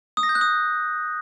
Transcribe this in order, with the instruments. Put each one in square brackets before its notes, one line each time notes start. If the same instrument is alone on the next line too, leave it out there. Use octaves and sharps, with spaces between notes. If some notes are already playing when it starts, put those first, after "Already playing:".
[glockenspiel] D#6
A#6
G6
F#6
D#6